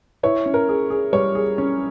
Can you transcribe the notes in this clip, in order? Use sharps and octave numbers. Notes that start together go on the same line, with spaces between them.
E4 C#5
C#4
A#4
G#4
G#4
G3 C#5
G#4
C#4